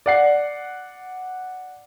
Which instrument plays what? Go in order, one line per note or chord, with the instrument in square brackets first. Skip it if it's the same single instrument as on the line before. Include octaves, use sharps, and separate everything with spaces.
[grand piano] D5 F#5 C7